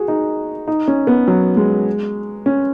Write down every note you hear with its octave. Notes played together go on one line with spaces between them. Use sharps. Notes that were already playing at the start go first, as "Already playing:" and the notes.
Already playing: F#4 G#4
D#4
D#4
C#4
B3
F#3
G#3
C#4